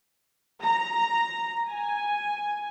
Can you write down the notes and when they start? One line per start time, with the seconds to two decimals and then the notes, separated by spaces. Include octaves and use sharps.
0.63 A#5
1.69 G#5